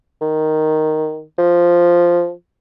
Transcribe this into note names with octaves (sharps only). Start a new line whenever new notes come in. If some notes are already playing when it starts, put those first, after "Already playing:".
D#3
F3